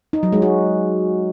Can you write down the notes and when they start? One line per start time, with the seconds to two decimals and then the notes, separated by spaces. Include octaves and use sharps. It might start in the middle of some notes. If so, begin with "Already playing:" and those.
0.13 D#4
0.23 F#3
0.32 G#3
0.42 F#4